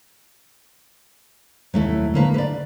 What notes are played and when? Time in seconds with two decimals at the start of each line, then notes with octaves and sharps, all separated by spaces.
1.74 F1 D#2 F#3 A3 E4
2.14 A2 D3 A#3 B4
2.34 B4 D5